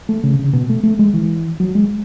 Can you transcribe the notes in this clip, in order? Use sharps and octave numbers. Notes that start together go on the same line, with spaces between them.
A3
C#3
C#3
B2
A3
A3
G#3
E3
F#3
G#3